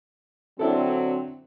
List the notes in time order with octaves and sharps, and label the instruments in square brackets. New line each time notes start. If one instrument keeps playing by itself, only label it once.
[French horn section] D3 F#3 C4 [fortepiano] D4 E4 A4